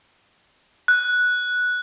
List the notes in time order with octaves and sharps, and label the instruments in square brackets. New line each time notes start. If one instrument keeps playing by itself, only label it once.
[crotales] F#6